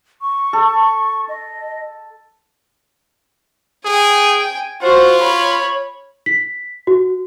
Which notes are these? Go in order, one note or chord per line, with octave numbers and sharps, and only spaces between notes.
C#6
A4
D#5
G#4 G5 G#5
F4 F#4 C5
C#5 B5
B6
F#4